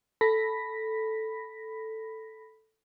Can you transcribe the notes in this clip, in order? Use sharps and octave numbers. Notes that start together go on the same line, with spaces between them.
A4 B5 A#6 B6